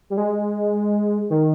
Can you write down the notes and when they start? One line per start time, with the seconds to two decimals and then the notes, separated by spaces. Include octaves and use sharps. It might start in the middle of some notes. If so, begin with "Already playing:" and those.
0.10 G3
0.17 G#3
1.30 D#3